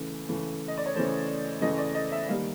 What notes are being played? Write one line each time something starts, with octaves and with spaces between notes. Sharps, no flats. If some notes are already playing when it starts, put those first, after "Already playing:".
Already playing: C#3 E3 A3
C#3 E3 A3
D#5
D5
C#5
C#3 E3 A3 C5
C#3 E3 A3 D#5
D5
D#5
E5
D#3 G3 A#3 F5